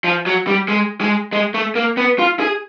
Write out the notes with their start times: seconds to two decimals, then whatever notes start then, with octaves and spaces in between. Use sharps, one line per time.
0.04 F3
0.26 F#3
0.47 G3
0.68 G#3
1.01 G#3
1.33 G#3
1.54 A3
1.75 A#3
1.97 B3
2.19 F4
2.40 G#4